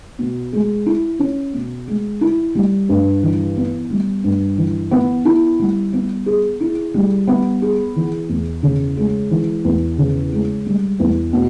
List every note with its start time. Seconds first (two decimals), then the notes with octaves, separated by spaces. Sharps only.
0.19 B2
0.53 G#3
0.86 E4
1.19 C#4
1.54 B2
1.88 G#3
2.21 E4
2.55 G3
2.89 G2
3.23 E3
3.57 B3
3.90 G3
4.24 G2
4.58 E3
4.91 B3
5.25 E4
5.59 G3
5.93 B3
6.26 G#4
6.61 E4
6.94 G3
7.27 B3
7.62 G#4
7.96 E3
8.29 E2
8.63 C#3
8.97 G#3
9.31 E3
9.64 E2
9.98 C#3
10.32 G#3
10.66 G3
11.00 E2
11.33 B2